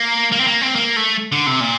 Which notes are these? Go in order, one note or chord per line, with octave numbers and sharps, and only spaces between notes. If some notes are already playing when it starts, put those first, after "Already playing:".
Already playing: A#3
A#3
C4
A#3
C4
A#3
A3
D3
C3
A#2